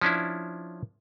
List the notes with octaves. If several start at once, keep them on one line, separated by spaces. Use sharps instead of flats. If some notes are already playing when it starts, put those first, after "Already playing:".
F3 C#4 D4 E4